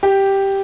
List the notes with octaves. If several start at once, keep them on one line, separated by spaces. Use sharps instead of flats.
G4